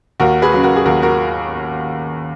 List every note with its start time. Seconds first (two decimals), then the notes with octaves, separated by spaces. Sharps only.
0.20 D#2 F#4 A#4
0.42 G#4 B4
0.53 C#3 F#3
0.63 F#4 A#4
0.76 G#4
0.85 D#2 F#4 A#4
1.02 F#4 A#4